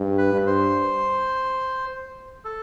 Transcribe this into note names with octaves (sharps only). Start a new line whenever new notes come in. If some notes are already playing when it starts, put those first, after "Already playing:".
Already playing: G2
B4
G2
C5
A4